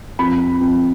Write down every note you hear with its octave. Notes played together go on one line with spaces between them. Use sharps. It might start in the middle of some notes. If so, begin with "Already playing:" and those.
F2 B5
F2